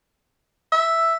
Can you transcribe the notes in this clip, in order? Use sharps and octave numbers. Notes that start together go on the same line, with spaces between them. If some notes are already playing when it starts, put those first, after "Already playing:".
E5